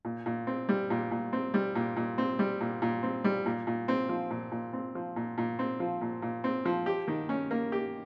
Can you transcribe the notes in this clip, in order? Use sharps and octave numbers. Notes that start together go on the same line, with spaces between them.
A#2
A#2
C4
G3
A#2
A#2
C4
G3
A#2
A#2
C4
G3
A#2
A#2
C4
G3
A#2
A#2
C4
F3
A#2
A#2
C4
F3
A#2
A#2
C4
F3
A#2
A#2
C4
F3
G4
D#3
C#4
A#3
G4